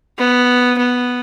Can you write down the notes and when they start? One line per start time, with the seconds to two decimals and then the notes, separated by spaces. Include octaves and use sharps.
0.18 B3
0.78 B3